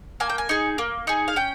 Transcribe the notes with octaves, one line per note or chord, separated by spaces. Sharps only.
A#3 G#5
G5
G#5
D#4 G#4
A#3
D#4 G#4
F5
C#4 G5